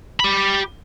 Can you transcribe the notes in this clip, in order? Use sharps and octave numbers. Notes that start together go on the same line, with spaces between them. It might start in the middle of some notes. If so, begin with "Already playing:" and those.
G4 B5